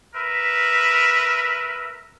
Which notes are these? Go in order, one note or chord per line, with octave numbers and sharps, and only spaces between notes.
A#4 B4 E5